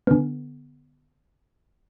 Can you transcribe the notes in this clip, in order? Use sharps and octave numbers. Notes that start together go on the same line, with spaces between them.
D3 B3